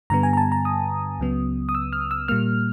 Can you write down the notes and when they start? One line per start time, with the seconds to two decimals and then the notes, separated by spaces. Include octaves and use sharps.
0.10 G2 D3 G3 B3 A#5
0.23 G#5
0.33 A#5
0.37 A5
0.52 A#5
0.65 D#6
1.19 C#2 C#3 F#3 B3
1.69 D#6
1.75 E6
1.93 F6
2.11 E6
2.28 A#2 G3 A#3 F6